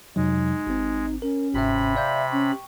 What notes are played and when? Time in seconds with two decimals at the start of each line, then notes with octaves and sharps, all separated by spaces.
0.16 F2 C3 F#3 G#3 D#4
0.67 G#1 C4
1.22 C#4 A#4
1.54 G1 G#2 C3 E5 B5
1.96 D5 E5 F5 G6
2.32 C#4 G5 C#6